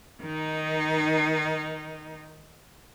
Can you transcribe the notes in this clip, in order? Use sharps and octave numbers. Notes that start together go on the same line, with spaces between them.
D#3 D#4